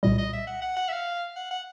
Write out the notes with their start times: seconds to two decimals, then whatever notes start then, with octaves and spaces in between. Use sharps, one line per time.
0.03 C2 A#2 G3 D#5
0.18 D#5
0.33 E5
0.47 F#5
0.62 F#5
0.76 F#5
0.88 E5
0.92 F5
1.36 F#5
1.51 F#5